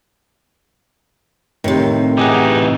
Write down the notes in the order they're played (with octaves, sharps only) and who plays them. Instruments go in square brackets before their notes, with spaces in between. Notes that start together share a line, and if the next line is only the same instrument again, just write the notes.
[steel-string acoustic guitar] A2 C3 [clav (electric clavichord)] D#3
[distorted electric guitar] E3 D#4 [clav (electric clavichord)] G4 G#4 F#5